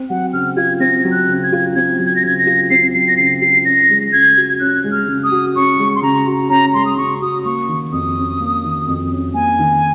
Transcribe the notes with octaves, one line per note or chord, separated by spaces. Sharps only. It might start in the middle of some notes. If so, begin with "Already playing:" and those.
Already playing: C4
F#3 F#5
C#3 F6
F4 G#6
C4 A#6
F#3
F#6
C#3
G#6
F4
C4 G#6
F#3
G#6
A#6
C#3 G#6
A#6
F4
C4 C7
F#3 C7
A#6
C#3 C7
F4 C7
C#4 A#6
G#3
C#3 G#6
F#4
C#4 F#6
G#3
F6
C#3
D#6
F#4
C#4 C#6
G#3
C6
C#3 A#5
F#4
C#4 A#5
G#3 C6
D#6
C#3 C#6
F#4 D#6
A#3 C#6
D#3
F2 D#6
C#4
A#3
D#3
F2
C#4
A#3 G#5
D#3